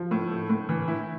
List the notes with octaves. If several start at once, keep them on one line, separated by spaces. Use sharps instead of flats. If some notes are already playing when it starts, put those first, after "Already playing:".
Already playing: F3
A2
A3
A2
E3
E4